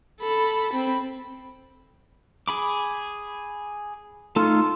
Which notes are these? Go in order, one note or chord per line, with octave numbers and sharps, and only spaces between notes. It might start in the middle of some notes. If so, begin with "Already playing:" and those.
A4 B5
C4 B5
G#4 B5 D6
A3 D#4 F4 A4